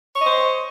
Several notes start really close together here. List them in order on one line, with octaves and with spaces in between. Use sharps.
C#5 D#5 C5